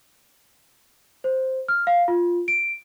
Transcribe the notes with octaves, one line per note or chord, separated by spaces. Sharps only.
C5
F6
F5
F4
D7